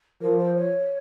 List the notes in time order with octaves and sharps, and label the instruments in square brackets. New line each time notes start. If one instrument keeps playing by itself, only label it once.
[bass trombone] F3 [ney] A#4
[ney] C5
C#5